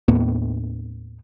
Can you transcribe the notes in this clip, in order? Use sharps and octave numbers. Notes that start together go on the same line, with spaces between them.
D#2 A2 A#3 B3